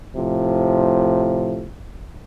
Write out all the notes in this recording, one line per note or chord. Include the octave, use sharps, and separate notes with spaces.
A2 C3 F3